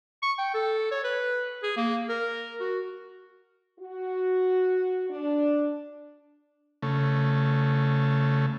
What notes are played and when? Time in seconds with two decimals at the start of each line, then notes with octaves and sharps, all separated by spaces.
0.23 C#6
0.38 G5
0.54 A4
0.91 C#5
1.04 B4
1.63 G#4
1.77 A#3
2.09 A#4
2.60 F#4
3.78 F#4
5.09 D4
6.82 C#3 A3